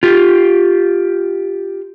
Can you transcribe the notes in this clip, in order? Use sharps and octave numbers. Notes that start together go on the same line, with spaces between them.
F4 G4